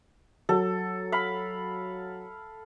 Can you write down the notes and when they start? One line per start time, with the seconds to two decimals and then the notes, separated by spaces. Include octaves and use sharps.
0.49 F#3 A4
1.12 F5 B5